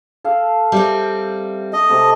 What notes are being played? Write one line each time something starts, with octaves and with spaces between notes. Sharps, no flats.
A4 F5
G3 C4 A#4 E5
A4 D#5
C3 A3